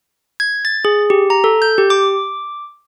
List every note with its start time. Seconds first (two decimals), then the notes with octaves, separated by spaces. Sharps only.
0.40 G#6
0.65 A6
0.85 G#4
1.10 G4
1.30 A#5
1.44 A4
1.62 G6
1.78 G4
1.90 D6